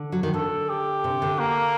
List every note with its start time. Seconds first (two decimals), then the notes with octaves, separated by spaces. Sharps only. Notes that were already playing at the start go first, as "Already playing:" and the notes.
Already playing: D3
0.12 F#3
0.23 D#3
0.34 D3 A4
0.69 G4
1.04 C3
1.22 D3
1.39 A#3